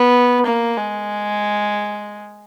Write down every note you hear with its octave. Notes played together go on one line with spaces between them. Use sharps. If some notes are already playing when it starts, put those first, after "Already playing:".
Already playing: B3
A#3
G#3